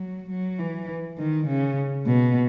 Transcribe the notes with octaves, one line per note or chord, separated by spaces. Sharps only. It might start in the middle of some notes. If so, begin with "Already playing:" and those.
Already playing: F#3
F#3
E3
D#3
C#3
B2